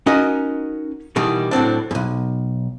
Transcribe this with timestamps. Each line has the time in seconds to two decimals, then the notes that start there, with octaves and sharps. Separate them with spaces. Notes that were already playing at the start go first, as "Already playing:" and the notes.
0.06 C#4 D#4 F#4 A#4 D#5
1.16 B2 D#3 E3 G3
1.51 A2 F#3 C4 D4
1.91 B1 E2